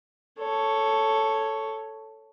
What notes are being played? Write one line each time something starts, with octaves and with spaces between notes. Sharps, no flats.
A4 C#5